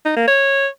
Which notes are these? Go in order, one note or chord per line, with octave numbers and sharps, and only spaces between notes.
D#4
A#3
C#5